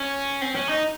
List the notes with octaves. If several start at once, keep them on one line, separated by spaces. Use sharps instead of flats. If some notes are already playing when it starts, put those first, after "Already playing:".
Already playing: C#4
C4
C#4
D#4